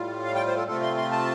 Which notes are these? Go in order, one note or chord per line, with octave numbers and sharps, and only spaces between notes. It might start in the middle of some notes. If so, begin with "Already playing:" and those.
Already playing: A2 G3 F4
F5
G5
C5
A4
C3 A3 C4 F4 A4
C6
C6
A5